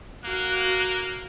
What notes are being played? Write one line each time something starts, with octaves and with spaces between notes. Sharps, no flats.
A#3 F#4 F#6